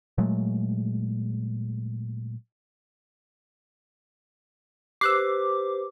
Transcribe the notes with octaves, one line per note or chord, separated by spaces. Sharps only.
A#2 F#3 G#3 A3
G4 B4 C5 D6 E6 F#6 C7